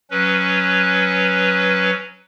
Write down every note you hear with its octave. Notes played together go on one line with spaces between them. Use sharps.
F#3 C#4 B4